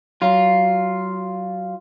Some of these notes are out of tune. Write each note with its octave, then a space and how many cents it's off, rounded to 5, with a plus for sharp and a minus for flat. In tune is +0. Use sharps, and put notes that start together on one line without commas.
F#3 +20 F4 +0